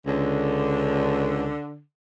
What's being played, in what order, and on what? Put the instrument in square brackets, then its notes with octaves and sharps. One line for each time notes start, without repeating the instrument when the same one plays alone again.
[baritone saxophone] C#2 [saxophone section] D3